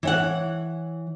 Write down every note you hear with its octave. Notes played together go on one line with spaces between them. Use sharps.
E3 C#5 F#5